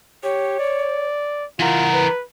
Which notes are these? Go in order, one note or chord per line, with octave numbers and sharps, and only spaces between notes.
G4 C#5
D5
E3 F4 A#4 F#5
B4